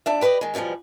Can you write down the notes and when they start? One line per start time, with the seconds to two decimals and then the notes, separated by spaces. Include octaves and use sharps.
0.06 D#2 D4 E5
0.21 G4 B4 C5 D5 D#5
0.41 D#3 G#3
0.54 E2 B2 D3 F3 G3